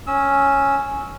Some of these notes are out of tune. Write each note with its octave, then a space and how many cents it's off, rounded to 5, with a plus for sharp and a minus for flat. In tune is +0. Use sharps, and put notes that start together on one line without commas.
C#4 +0 E6 -20